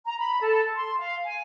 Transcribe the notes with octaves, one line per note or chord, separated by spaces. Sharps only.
A#5
B5
A4
C6
F5
G#5